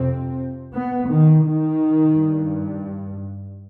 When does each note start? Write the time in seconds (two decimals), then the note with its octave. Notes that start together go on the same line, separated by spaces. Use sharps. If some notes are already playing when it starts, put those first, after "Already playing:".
Already playing: F2 C3 C4
0.75 B3
1.11 D#3
1.47 D#3
2.16 G2